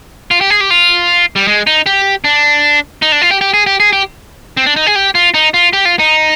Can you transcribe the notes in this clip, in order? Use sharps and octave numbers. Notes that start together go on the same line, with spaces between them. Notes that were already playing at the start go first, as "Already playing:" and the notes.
F4
G4
G#4
G4
F4
G3
G#3
D#4
G4
D4
D#4
D4
F4
G4
G4
G#4
G4
G#4
G4
C4
D4
D#4
G#4
G4
F4
D#4
F4
G4
F4
D#4